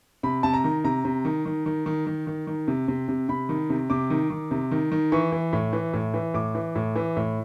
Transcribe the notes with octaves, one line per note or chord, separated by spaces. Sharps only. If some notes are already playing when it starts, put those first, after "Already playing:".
C3 B5
C3 A5
A#5
D#3
C3 A#5
C3
D#3
D#3
D#3
D#3
D#3
D#3
D#3
C3
C3
C3
C3 B5
D#3
C3
C3 D6
D#3
D#3
C3
D#3
D#3
E3 C#6
E3
A2
E3
A2
E3
A2 D6
E3
A2
E3
A2